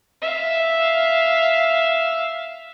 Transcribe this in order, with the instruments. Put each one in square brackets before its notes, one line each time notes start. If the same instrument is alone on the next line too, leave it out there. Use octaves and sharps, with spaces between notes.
[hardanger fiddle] E5 F5